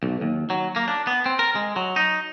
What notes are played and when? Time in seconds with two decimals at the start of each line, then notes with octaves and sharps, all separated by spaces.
0.03 B1
0.21 D#2
0.50 F#3
0.76 A#3
0.88 D4
1.07 B3
1.26 C4
1.39 A#4
1.55 G#3
1.76 F#3
1.96 D#4